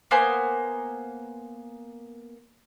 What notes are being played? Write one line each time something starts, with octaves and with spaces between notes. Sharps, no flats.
A#3 B3 C5 G#5